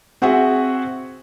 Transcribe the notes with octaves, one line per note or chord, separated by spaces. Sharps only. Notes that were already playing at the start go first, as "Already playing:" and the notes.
C4 F#4 G#4 E5 F#5